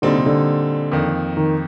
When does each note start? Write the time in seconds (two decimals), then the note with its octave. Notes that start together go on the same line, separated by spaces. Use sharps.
0.02 A#2 D3 G3 C4 D#4
0.14 C3
0.26 D3
0.92 F2 D#3 A#3
1.37 D#3